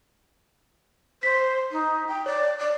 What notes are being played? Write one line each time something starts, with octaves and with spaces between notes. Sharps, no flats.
C5 B6
D#4
G5
C#5 D5
D5